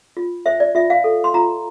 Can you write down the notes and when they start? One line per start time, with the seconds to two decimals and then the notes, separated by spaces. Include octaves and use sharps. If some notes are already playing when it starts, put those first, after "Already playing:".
0.17 F4
0.46 C5 E5
0.60 D5
0.75 F4 E5
0.90 F5
1.04 A4
1.24 C6
1.34 F4 A#5